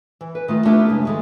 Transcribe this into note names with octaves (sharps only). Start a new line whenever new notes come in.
E3
B4
D#3 A3 F4
A3 B3 D4 E4 G4 A#4
F#2 C#3 G#3
D#2 D3 D#3 G#3 A3